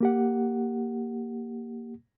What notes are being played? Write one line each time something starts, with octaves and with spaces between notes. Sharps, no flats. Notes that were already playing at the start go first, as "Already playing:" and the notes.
A#3 G4 F#5